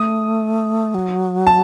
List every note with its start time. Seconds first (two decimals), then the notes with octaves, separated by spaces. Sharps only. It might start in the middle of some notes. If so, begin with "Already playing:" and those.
Already playing: A3 D#6
0.95 F#3
1.47 A5